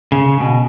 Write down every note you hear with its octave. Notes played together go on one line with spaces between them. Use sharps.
C#3
B2